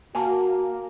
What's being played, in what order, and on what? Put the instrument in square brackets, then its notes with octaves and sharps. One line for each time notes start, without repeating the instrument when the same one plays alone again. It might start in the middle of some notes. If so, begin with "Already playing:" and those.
[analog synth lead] A#3 [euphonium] F#4 [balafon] G#5 A5